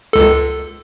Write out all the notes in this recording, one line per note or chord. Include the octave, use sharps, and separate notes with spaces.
C#2 A4